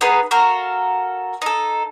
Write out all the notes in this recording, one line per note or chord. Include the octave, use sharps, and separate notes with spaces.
B3 D#4 G#4 B4
F#4 A4 A#4 F5
D#4 A4